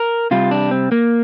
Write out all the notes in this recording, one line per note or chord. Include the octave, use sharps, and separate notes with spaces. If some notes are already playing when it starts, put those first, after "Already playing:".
Already playing: A#4
C3 G3 F4
D4
C4
A#3